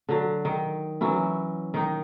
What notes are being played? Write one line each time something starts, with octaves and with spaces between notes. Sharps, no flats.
D3 F#3
D#3
E3 F#3 C#4 E4
D#3 D#4